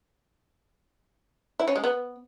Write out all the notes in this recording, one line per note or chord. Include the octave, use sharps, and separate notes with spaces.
E4
C#4
G#3
B3